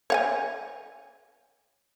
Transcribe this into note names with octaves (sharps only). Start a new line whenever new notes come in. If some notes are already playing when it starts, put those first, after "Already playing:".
C#5 F#5 G#5